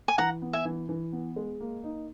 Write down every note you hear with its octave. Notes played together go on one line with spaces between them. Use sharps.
G#5
E3 F#5 A#5
B3
E5 G#5
E3
E3
B3
G#3
A#3
D#4